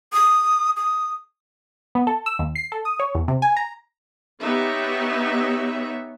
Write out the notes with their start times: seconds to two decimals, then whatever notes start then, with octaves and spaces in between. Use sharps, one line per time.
0.13 D#6
0.76 D#6
1.95 B3
2.07 A4
2.26 E6
2.39 D#2
2.55 C7
2.72 A4
2.85 D#6
3.00 C#5
3.15 E2
3.28 C3
3.42 G#5
3.57 A#5
4.41 B3 D#4 G4 B4 C#5 E5